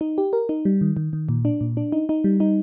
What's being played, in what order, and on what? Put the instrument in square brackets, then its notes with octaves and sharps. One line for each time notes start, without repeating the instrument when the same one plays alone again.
[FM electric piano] D#4
G4
A#4
D#4
G3
D#3
D#3
D#3
A#2
D4
A#2
D4
D#4
D#4
G3
D#4